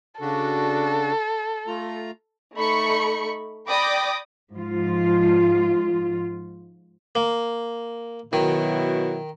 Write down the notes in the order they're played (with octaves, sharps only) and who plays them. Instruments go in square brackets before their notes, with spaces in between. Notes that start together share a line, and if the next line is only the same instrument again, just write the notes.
[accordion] C#3 D4 F#4 [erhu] A4
[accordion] A3 F4 A#5
[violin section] A3 D#4 B5 C#6 C#7
D5 G5 B5 D6 D#6 A#6
[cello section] G#2 F3 F4
[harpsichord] A#3
[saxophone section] B2 F#3 E4 [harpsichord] D#3